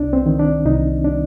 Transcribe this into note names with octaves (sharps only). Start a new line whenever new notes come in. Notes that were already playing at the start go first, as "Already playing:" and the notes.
Already playing: C2 D4
C4
D#3
D4
C2 D#4
D4